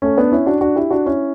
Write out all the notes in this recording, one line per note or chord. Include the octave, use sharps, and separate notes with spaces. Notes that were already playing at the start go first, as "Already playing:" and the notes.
A3 C#4
B3 D4
C#4 E4
D4 F#4
D4 F#4
E4 G4
D4 F#4
C#4 E4